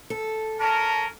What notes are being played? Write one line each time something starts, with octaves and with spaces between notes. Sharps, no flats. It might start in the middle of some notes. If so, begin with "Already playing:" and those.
A4
C#4 A#4 A5